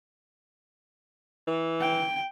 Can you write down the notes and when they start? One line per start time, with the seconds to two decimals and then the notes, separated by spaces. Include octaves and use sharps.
1.47 E3
1.81 G5